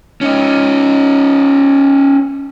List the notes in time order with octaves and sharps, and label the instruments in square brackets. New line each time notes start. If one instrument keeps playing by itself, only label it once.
[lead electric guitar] C#4 D#4